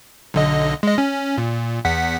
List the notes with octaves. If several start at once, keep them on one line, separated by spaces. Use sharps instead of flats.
B1 D3 D#5
G#3 D#5
C#4
A#2
E2 F#5 B6